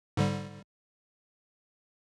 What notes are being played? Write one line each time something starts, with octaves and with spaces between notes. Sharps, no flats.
G#2 D3 G3